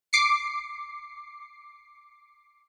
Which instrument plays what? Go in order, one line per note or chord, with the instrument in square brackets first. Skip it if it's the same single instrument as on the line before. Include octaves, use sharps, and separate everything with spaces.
[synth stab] D6 C7 C#7